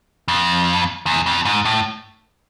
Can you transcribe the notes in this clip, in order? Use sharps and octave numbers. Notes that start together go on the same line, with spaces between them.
F2
E2
F2
G#2
A2